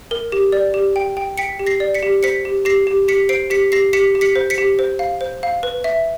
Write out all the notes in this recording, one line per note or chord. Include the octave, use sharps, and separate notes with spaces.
A#4
G4
D5
G4
G5
G5
G5 B6 C#7
G4
A#6 C7
D5
B6 C#7
G4
C5 B6 C#7
G4
G4 A#6 C7
G4
G4 B6 C#7
C5 C7 D7
G4 B6 C#7
G4 A#6 C7
G4 B6 C#7
G4
B6 C#7
C5
B6 C#7
G4
C5
F5
C5
F5
B4
E5